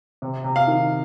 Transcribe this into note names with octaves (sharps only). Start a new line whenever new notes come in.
C3
C3
F5
D#3